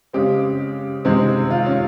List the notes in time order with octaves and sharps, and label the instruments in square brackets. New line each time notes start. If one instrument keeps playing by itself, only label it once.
[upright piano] C#3 G#3 C4 G4
C3 D#3 G#3 C4
F4
C#4